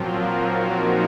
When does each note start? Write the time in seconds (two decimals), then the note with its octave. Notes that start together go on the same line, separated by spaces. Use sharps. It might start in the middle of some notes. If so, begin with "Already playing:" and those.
Already playing: A#2 F3 F#3 A#3 C4 F4 A#4
0.13 F#3 F#4
0.45 D#4
0.76 C#4